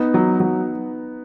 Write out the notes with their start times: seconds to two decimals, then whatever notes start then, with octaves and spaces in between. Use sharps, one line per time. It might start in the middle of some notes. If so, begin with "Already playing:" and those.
Already playing: B3 D#4
0.14 F#3
0.40 F#3